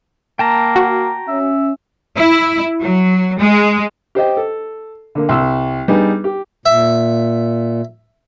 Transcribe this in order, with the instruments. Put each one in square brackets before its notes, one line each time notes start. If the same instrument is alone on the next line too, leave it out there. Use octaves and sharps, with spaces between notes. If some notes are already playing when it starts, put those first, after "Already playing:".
[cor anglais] A#3 [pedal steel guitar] G5 A5 A#5
[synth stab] F#4
[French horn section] C#4 [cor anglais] E5
[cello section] E4
F#3
G#3
[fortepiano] G4 C5 D#5 G5
A4
D3 A#3
C2 C6 E6
G3 B3 D4 D#4 G#4
G4
[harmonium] A#2 [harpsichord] E5